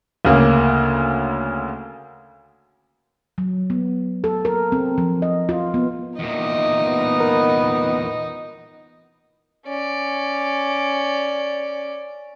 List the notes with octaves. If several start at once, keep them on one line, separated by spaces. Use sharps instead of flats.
D2 C#3 A#3
F#3
B3
A4
A#4
C4
F3
D#5
F4
B3
E2 A#2 D#4 D#5
B3
A#4
C#4 D5